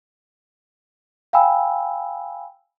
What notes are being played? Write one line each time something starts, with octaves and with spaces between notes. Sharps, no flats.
F5 G5 G#5 B5 E6